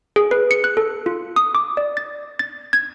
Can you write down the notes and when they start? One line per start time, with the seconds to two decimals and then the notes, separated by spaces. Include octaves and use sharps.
0.16 G#4
0.31 B4
0.51 C#7
0.64 F#6
0.77 A4
1.06 F4
1.36 D#6
1.55 D6
1.77 D5
1.97 A6
2.39 A6
2.73 G#6